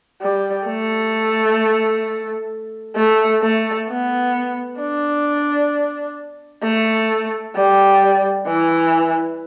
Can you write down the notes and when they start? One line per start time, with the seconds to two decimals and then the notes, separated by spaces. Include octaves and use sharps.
0.21 G3
0.67 A3
2.96 A3
3.42 A3
3.88 B3
4.80 D4
6.64 A3
7.56 G3
8.47 E3